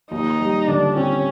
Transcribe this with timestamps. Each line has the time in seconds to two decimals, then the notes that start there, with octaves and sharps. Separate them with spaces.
0.11 D#2 D#4
0.40 G3
0.67 D3 D4
0.96 C4 C#4